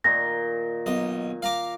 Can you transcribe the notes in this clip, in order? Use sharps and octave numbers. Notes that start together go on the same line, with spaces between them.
A#2 D#3 C6 A#6
B1 D#5
F5 A#5 D6